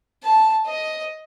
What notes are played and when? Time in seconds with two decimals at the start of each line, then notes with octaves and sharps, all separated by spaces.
0.23 A5
0.67 D#5